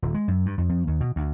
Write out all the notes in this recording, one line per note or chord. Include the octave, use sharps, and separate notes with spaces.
D#1
G#3
F#2
G2
F2
F2
D#2
B2
D2